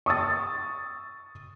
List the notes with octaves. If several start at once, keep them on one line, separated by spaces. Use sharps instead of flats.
C#6 D#6 E6 A6